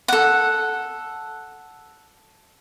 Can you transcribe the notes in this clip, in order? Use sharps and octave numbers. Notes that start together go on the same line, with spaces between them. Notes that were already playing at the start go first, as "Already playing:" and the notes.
A4 F#5